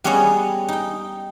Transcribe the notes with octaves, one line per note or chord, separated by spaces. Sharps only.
G3 B3 C#4 G#4 C#5 D#5
D#4 G5